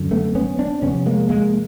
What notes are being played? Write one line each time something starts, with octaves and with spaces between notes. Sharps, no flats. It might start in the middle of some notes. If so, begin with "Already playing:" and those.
Already playing: F#2 D3
A3 B3
B3 C#4
C4 D4
F2 C3 B3 C#4
G#3 A#3
G#3 A#3